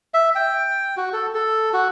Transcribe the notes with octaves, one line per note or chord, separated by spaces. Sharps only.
E5
G5
F#4
A4
A4
F#4